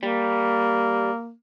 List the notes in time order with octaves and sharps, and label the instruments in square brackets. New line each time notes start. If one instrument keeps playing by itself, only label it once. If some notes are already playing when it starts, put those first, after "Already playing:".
[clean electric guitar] G3 [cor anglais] A#3